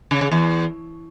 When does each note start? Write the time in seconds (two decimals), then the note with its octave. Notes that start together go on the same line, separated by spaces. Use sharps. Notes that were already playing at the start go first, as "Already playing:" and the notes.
0.11 C#3
0.21 C#3
0.31 E2